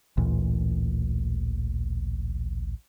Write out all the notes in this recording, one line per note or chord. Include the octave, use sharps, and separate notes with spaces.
A1 D2 A#2 E3